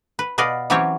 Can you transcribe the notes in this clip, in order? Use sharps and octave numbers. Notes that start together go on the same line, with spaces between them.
B4
B2 B4 D5 D#5 F5
E3 F#3 C4 C#4 G4 C#5